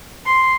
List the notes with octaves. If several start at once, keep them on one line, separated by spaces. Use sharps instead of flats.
C6